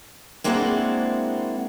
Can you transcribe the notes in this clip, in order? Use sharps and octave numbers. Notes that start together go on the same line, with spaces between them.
G#3 A#3 C4 D4 E4 F#4